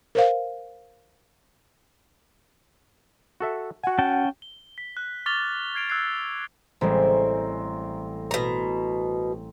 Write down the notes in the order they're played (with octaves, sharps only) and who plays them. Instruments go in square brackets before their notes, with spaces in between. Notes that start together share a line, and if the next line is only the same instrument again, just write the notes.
[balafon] A#4 C5 F5
[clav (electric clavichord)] F#4 A4 E5
[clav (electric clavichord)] F#4 G#5 [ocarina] F#5
[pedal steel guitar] C#4 G5 A5
[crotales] G7
B6
F#6
C#6 D6 F6 A6 F7 G7
F6 G#6 C7 D7 F7
E6 F#6 G#6 C7
[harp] A1 G3 G#3 [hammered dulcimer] C4 A#4 C5
[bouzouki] B2 A#5